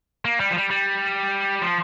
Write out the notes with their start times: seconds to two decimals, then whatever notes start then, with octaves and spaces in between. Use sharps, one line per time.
0.25 A#3
0.40 G3
0.51 F3
0.56 G3
0.70 G3
1.62 F3